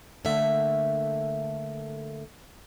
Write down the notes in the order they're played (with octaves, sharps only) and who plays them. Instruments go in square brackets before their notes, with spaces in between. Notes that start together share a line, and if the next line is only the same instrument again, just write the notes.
[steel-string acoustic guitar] D3 A3 A#3 E5